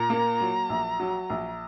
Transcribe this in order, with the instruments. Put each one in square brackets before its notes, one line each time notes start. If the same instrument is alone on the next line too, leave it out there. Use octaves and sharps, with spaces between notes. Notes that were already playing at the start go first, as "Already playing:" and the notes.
Already playing: [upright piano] A#2 [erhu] A#5
[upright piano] A#3
F#3
A#1
F#3
A#1